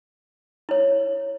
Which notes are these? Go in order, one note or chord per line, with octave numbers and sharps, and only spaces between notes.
E4 C#5